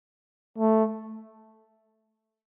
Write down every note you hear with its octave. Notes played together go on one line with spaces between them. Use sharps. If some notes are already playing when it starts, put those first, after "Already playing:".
A3